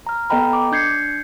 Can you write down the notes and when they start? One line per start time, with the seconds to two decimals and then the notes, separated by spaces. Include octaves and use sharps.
0.07 A#5 F6
0.30 B3 A4 D#5 G5 A#5 B5
0.53 D6
0.72 D4 G6 G#6 C7 C#7